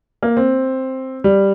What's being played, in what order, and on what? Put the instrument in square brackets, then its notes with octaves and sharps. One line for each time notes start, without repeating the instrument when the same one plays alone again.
[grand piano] A#3
C4
G3